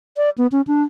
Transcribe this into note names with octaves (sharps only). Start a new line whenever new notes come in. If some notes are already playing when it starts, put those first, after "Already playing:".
D5
B3
C#4
D4